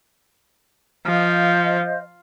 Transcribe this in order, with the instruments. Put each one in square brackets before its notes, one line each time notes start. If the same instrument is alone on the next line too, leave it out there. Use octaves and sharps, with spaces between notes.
[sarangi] F3 [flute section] C5 D#5 F5